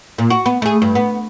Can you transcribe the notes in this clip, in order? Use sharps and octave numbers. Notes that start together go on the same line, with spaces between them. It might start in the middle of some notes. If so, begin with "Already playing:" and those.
A#2
F#4
B3
A3 G#4
G2
B3